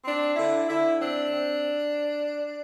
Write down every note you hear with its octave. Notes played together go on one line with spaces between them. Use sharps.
C4 D4
D3 E4
D3 E4
C4 D4
C4